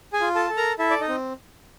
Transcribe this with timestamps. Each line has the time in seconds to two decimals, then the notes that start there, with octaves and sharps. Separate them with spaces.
0.13 G#4 G#5
0.21 F4
0.35 A4 A5
0.50 A4
0.57 A#4 A#5
0.79 E4 A4 E5
0.90 D5
1.00 D#4 D#5
1.09 C4